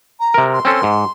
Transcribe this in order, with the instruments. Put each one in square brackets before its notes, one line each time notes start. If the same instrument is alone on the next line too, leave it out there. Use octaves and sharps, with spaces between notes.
[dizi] A#5
[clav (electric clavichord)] C3 A#4
[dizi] C6
[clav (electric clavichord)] C4 C#4 A4
G#2